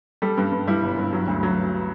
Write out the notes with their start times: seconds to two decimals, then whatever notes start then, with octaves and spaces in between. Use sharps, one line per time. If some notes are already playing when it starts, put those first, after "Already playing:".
0.22 G3 A4
0.37 G2
0.52 G2
0.67 G3 E4
0.83 G1
0.98 G2
1.13 F#3
1.28 D2
1.43 F#3